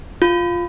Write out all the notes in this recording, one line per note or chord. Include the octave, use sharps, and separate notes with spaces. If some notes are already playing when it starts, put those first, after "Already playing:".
F4